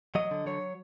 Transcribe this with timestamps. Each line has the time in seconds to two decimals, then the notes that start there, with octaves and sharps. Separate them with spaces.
0.15 F#3 D#5
0.31 D3
0.46 F#3 C#5